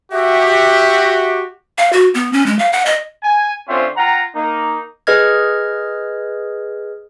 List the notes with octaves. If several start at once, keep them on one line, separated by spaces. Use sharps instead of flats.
F#4 G4 E5
F5
F#4
B3
C#4
G#3
F5
F#5
D#5
G#5
D3 C4 C#4 F4 C5 E5
F4 F#5 G5 A#5
A#3 D#4
G#4 B4 D#5 F6 G#6